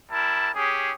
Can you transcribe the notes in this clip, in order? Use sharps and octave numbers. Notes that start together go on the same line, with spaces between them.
G3 E4 A#4 A5
C#4 G4 G#4